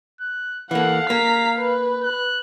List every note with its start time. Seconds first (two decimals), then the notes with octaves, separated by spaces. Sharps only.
0.20 F#6
0.71 E3 A#3 A4 F5 F#5
1.10 A#3 A#5 B6
1.59 B4
2.04 F#6